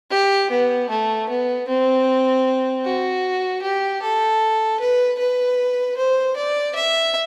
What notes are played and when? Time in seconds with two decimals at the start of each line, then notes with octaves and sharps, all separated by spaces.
0.10 G4
0.50 B3
0.89 A3
1.29 B3
1.68 C4
2.85 F#4
3.62 G4
4.02 A4
4.80 B4
5.19 B4
5.97 C5
6.37 D5
6.75 E5